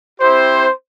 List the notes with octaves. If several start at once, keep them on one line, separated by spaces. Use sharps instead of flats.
C4 E4 G4 C5